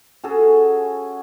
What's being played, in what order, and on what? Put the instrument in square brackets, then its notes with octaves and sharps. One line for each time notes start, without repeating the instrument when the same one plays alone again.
[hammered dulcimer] C#4 F#4 G#4 A4